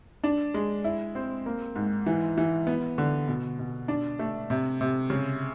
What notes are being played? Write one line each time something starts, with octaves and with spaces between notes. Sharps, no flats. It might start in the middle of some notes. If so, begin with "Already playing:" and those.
D4
G#3
E4
C4
A#3
G#2
E3
E3
B3
D3
B2
B2
D4
A3
C3
C3
C#3